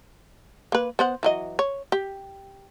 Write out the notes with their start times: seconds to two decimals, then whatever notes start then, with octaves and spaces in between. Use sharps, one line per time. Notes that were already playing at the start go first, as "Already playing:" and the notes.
0.72 A#3 B4
0.99 B3 C5 F#5
1.23 E3 F#3 D#5
1.59 C#5
1.92 G4